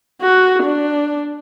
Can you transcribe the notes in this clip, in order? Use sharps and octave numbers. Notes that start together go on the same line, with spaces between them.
F#4
D4